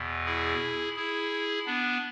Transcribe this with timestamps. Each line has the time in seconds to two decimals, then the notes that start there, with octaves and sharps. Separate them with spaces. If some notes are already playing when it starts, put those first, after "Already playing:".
Already playing: E2 B2
0.26 E4 G#4
0.96 E4 G#4
1.66 B3 D4